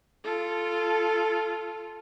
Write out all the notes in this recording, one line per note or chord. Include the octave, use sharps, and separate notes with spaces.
F4 A4